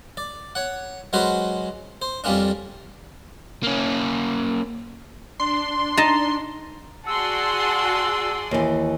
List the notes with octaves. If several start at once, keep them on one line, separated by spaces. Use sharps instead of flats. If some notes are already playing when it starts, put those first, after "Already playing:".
D5
C#5 F#5
F#3 G#3 C#4 F#4 B4 C5
C5
F2 F3 G3 A#3 C#4 D4
A#3 C#4
D4 C6
D#4 A5 A#5
F#4 G#4 D5 F#5 A5 C6 E6
D#2 E3